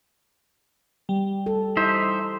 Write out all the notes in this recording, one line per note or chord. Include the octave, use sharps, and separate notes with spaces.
G3
A4
D#4 E4 C5 E5